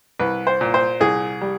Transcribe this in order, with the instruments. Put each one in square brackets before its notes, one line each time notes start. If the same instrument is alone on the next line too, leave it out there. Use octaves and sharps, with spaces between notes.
[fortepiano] C2 B4
C5
A#2
C5
C2 G#4
G3